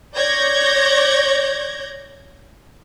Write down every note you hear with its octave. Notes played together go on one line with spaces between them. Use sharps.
C#5 D5 G6 G#6 A#6